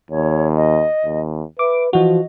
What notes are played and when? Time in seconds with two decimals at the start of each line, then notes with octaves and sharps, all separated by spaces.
0.11 D#2 C#5
0.57 D#5
1.05 D#2
1.59 B4 E5 D6
1.93 E3 F3 F#4 D#5